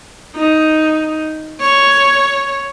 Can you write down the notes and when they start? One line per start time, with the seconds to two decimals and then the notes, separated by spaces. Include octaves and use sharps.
0.36 D#4
1.60 C#5